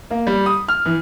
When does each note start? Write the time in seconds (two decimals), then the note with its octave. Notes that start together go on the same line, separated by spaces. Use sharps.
0.11 A#3
0.27 G3
0.46 D#6
0.68 F6
0.85 E3